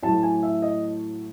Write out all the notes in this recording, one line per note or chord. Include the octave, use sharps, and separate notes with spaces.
A2 F#3 A3 A5
G#5
E5
D#5